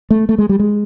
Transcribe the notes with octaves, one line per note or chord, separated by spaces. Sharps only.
A3
A3
G#3
G3
G#3